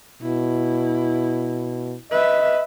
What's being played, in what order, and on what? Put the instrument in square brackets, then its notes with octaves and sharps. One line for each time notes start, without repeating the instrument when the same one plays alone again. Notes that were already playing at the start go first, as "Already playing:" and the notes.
[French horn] B2 [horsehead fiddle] E4
[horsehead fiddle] B4 E5 [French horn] D#5